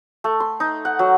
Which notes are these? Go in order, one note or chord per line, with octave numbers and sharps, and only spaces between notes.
A3
C6
D#4
F#5
F#3